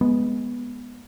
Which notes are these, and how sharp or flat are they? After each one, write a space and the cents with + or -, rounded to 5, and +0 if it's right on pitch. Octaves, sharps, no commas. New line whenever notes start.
G#3 +5 B3 -10